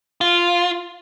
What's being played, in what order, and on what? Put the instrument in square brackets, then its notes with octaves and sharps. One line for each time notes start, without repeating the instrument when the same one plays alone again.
[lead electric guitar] F4